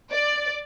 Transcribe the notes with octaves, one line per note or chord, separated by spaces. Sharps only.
D5